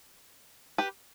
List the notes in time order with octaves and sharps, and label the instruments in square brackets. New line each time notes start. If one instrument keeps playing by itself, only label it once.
[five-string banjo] G4 B4